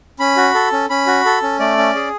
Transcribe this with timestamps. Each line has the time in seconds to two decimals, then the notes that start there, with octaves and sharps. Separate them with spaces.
0.19 C#4 B5
0.37 F#4
0.55 A4
0.72 C#4
0.90 C#4 B5
1.07 F#4
1.25 A4
1.42 C#4
1.59 A3 D5
1.78 C#4
1.95 G#4